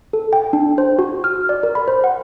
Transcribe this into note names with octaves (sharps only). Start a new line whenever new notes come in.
A4
G5
D4
C5
F#4
F6
D5
A#4
B5
C5
F#5